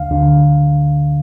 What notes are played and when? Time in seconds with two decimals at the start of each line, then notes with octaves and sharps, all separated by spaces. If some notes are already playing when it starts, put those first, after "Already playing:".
Already playing: D2 D3 F5
0.11 D2 D3